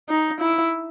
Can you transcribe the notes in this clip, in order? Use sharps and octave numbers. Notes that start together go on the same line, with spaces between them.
D#4
E4